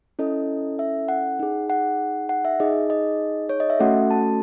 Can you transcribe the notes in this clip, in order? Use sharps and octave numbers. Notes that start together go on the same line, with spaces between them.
C#4 E4 A4 D#5
E5
F#5
D#4 G#4
F#5
F#5
E5
D#4 G#4 D#5
D#5
C#5
D#5
E5
A3 C#4 F#4 A4 F#5
A5